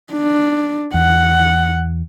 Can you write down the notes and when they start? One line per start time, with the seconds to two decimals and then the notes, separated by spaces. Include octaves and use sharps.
0.13 D4
0.94 E2 F#5